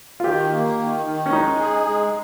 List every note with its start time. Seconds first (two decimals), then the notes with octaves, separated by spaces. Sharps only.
0.20 F4
0.24 D#3 G4
0.51 A#3
0.79 D#3
1.06 D#3
1.26 C#4
1.32 G#3 D#4
1.60 G#4
1.86 G#3